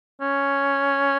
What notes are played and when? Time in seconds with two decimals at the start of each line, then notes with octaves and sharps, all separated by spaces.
0.21 C#4